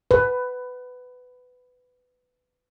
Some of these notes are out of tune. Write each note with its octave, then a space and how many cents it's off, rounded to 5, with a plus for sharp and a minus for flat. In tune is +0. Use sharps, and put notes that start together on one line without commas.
B4 +15